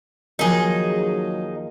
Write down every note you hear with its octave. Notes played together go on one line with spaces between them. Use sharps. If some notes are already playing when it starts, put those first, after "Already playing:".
D#2 F3 F#3 D#4 G#4